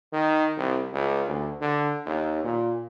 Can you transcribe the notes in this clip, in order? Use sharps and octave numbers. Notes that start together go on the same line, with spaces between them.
D#3
C2
C#2
D2
D3
D#2
A#2